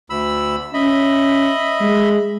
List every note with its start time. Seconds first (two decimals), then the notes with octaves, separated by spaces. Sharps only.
0.10 D2 B5 E6
0.74 C#4 D#5 E5 B5
1.81 G#3